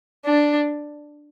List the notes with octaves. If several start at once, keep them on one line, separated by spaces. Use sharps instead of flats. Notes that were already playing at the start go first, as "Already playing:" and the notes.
D4